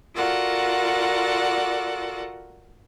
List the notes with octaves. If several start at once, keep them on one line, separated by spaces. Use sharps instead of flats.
F4 F#4 A4 A#4 D5 F#5